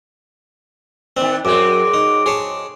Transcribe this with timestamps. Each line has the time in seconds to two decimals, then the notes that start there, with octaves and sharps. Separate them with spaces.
1.17 D#3 C4 D4
1.45 F#2 F#3 G#3 C4 D6
1.94 D#4
2.26 G#4 C#5 A5